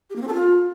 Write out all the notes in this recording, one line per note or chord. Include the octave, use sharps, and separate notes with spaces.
G4
A#3
C4
A4
F4